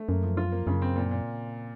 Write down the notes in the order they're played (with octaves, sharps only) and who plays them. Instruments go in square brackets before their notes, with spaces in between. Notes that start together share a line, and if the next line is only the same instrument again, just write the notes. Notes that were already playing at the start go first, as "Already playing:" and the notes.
Already playing: [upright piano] A3
[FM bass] F#2 [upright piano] A#3
[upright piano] F3
F4
A#3
[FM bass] F#2 [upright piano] C#3
[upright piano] C4
A#2
A#2